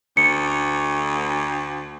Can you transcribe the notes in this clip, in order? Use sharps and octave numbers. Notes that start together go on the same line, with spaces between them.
D2 C#7